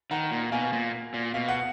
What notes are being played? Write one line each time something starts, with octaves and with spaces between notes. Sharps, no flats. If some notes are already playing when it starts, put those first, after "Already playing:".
D#3 F#5 A#5
A#2
B2 F5 G#5
A#2
A#2
B2 F5
F#5